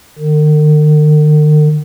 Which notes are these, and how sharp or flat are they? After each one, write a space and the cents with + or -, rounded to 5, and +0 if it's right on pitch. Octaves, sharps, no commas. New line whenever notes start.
D#3 -45